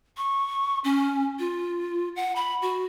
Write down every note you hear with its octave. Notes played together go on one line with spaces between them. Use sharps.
C#6
C#4
F4
F#5
B5
F#4